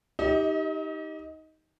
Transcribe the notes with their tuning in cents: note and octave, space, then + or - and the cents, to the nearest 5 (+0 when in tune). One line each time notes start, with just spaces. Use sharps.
D#4 +15 G4 +0 D#5 +40